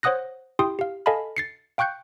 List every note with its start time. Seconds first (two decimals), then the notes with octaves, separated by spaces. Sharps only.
0.03 C5 C#5 F#5 D#6 F#6 A#6
0.59 E4 G4 G5 C6 D#6
0.79 G4 F5
1.06 A4 D#5 F5 G#5 A5 B5
1.37 A6 C7 C#7
1.78 F5 G5 C#6 F#6 G6 C#7